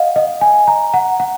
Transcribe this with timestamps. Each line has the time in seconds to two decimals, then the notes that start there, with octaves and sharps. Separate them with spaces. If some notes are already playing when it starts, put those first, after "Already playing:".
Already playing: D#5 F5 F#5
0.16 D#5
0.41 G#5
0.67 A#5
0.94 F#5
1.20 F#5